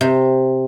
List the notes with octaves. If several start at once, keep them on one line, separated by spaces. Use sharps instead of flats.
C3